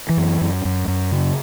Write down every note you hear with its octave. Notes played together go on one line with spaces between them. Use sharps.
E3
F#2
F#2
F#2
F#2
C#3